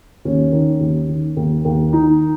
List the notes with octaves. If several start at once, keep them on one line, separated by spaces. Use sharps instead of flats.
D#2 C#4
D#3
D#2
D#3
D#2
D#2
D#3 D#4